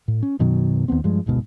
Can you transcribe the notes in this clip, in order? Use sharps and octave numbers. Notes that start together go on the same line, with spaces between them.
A2
C#4
F#2 B2 D#3 F#3
D#2 A2 B3 C4
G2 F3 G#3
D1 G1 G#2 B2